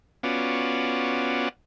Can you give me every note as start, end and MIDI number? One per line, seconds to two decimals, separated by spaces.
0.23 1.49 59
0.23 1.49 61
0.23 1.49 65
0.23 1.49 66
0.23 1.49 74